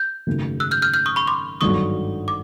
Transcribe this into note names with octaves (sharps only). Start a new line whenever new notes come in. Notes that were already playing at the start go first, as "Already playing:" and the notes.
Already playing: G6
G#1 F#2 C#3 F#3 A3
E6 F#6
F6 G6
F6 G6
F6 G6
C#6 D#6
B5 C#6
C6 D6
G#1 G2 D3 F#3 C#6 D#6
D6